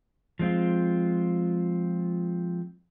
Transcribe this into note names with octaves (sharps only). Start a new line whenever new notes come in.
F3 G#3 C4 F4